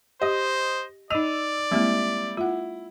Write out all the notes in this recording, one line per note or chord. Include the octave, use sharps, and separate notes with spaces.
G4 C5 D#5
D#4 D5 D#5 E6 D#7 F7
G3 G#3 A#3 C4 E4
E4 F4 F#5